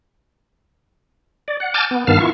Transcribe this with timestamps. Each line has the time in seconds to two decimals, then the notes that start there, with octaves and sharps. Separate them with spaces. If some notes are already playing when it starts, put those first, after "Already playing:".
1.48 D5
1.60 F#5
1.74 G#5 A5 D6 F6 G6 A6
1.91 B3
2.07 G2 D#3 B3 F5 A5 F6
2.20 E4 F4 C#6